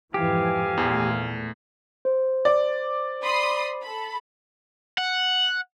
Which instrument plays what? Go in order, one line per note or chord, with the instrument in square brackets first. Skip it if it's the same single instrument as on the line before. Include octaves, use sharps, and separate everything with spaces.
[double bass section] F2 G#2 E3 [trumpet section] C4 F5 G#5 [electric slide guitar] G4
[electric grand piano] E2 [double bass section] A#2 A3
[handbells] C5
[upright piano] D5
[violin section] B5 C6 D#6
A4 B5
[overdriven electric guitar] F#5